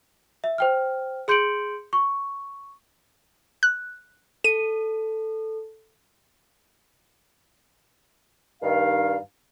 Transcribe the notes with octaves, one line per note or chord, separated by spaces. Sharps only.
E5
C5 G5 F6
G#4 C6 G6 C#7 D7 F#7
C#6
F#6
A4 D#7
G2 D#3 F5